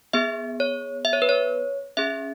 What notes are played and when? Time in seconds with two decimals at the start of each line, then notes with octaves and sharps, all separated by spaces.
0.13 B3 G#4 E5
0.60 C#5
1.05 E5
1.13 C#5
1.22 B4
1.29 C#5
1.97 C#4 G#4 E5